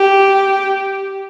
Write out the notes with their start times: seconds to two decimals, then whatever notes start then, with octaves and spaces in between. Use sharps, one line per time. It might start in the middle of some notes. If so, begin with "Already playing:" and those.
Already playing: G4